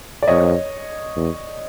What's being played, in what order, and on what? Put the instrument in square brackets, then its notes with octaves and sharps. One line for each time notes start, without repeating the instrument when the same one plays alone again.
[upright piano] D5
[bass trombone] F2 [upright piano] C#5 D#5
[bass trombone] E2